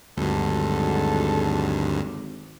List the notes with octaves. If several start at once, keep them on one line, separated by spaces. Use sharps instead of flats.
G#1 D2 G2 D3 F#3 G#3 A4